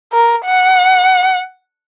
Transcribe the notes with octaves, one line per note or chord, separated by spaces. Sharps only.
A#4
F#5